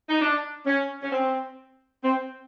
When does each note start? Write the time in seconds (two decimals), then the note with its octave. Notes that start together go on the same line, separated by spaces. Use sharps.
0.09 D#4
0.20 D4
0.66 C#4
1.02 C#4
1.12 C4
2.04 C4